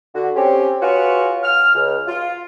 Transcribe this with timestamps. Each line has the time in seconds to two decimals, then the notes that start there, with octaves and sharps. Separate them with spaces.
0.14 D3 F#4
0.35 C4 C#4 G4
0.81 F4 F#4 G#4 B4 C#5
1.43 F6
1.74 C#2
2.08 F4